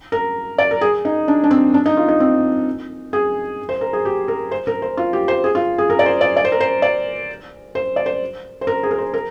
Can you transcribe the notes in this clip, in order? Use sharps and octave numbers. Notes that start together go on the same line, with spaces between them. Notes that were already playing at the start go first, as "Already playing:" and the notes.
A#4
D5
A#4
G#4
D#4
D4
D4
C4
D4
D#4
F4
D#4
C4
G#4
C5
A#4
G#4
G4
A#4
C5
A#4
C5
F4
G4
C5
G#4
F4
G#4
A#4
D5
C5
D5
D5
C5
A#4
C5
D5
C5
D5
C5
C5
A#4
G#4
A#4
C5
A#4